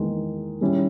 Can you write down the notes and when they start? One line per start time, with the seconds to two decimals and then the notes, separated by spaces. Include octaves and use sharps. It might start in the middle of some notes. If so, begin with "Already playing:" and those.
Already playing: E2 D#3 G#3 D#4
0.61 D#3 G3 C#4 E4